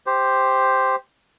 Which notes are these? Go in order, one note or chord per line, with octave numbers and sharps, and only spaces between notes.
G4 C5